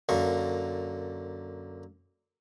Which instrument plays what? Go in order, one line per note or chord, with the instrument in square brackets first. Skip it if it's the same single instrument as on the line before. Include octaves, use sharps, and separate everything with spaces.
[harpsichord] F#2 D3 A#3 C#6